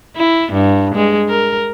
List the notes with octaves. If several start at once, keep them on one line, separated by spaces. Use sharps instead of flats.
E4
G2
G#3
A#4